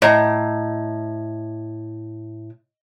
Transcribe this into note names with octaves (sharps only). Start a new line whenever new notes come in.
A2 C#5 D#5 A#5